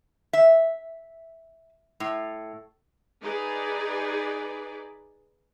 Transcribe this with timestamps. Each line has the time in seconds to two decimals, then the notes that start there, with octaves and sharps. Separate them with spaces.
0.33 E5
2.00 A2
3.22 D#4 G#4 B4 D5